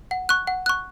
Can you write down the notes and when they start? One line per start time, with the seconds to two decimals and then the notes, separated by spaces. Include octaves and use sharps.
0.11 F#5
0.29 C#6 F#6
0.47 F#5
0.66 C#6 F#6